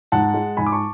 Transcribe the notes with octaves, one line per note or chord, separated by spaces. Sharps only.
G#2 F#5 A5
G#3
G#2 G#5 B5
D6
A5 C#6